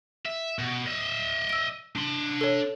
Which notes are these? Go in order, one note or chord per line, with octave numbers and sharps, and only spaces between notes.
E5
B2
D#5 E5
E6 D7
D4 C6
A4 C#5